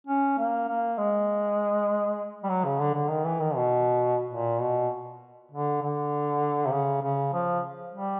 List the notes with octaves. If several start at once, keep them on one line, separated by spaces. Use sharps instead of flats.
C#4
A#3
A#3
G#3
G3
F#3
C#3
D3
D3
D#3
E3
D#3
B2
A#2
B2
D3
D3
C3
C#3
C#3
F3
G3